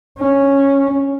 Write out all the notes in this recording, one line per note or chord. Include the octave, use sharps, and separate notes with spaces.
C#4